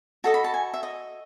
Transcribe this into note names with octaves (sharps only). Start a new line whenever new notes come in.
F#4 A4 D#5 A5
B5
A5
G#5
E5
D#5